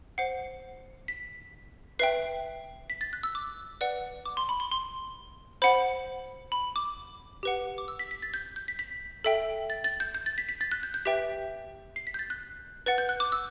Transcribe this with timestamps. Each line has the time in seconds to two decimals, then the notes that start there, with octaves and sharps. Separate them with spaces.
0.18 C5 F#5 C7
1.08 B6
1.99 B4 E5 G5 C7
2.90 B6
3.01 A6
3.13 F#6
3.23 E6
3.35 D6
3.81 B4 D5 F#5
4.25 D6
4.37 C6
4.49 B5
4.60 C6
4.71 C6
5.62 C5 F#5 B5
6.52 B5
6.76 D6
7.43 G4 B4 F#5
7.78 D6
7.88 E6
7.99 B6
8.11 B6
8.22 A6
8.34 G6
8.56 G6
8.68 B6
8.79 B6
9.24 A4 E5 G5
9.70 A6
9.84 A6
10.00 G6
10.15 G6
10.26 A6
10.38 B6
10.49 B6
10.61 A6
10.72 F#6
10.83 G6
10.94 G6
11.05 G4 B4 E5 G5 B6
11.96 C7
12.07 B6
12.14 G6
12.19 A6
12.30 F#6
12.86 B4 F#5 A6
12.98 G6
13.09 F#6
13.20 D6
13.32 E6